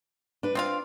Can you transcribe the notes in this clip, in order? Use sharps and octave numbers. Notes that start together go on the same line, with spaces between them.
D4 B4
C4 D4 F4 F5